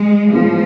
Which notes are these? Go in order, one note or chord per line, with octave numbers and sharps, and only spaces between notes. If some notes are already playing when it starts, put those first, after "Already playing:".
Already playing: G#3
A2 F3 G#3 B3 F4 G#4